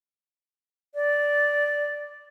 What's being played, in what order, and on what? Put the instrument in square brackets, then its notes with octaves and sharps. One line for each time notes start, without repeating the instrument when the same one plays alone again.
[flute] D5